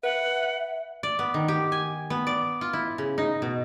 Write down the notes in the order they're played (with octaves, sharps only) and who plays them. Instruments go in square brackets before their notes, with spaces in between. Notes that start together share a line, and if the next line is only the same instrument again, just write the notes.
[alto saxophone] B4 [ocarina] E5 [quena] F#5
[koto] D5
B3
D#3
G4
G#5
B3
D5
F4
E4
C#3
D#4
B2